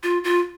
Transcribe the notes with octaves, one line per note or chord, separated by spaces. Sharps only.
F4
F4